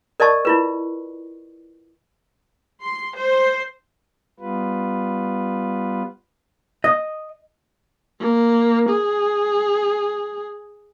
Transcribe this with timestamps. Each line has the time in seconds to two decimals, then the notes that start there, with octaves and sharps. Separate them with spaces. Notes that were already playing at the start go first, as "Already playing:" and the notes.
0.20 A#4 D5 D#5 A5 C#6
0.45 E4 F4 B4
2.82 C6
3.16 C5
4.40 G3 B3 F4 B4
6.84 D#5
8.20 A#3
8.90 G#4